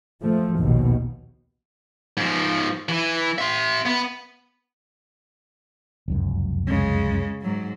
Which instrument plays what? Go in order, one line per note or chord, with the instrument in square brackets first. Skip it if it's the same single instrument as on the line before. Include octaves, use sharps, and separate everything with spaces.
[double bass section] F3 A3
A#1 D#2 B2
[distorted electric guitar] G#2 F3
E3
E5 C6
B3
[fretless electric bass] F1 C#2 F#2
[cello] C#3 G#3
G#2 F#3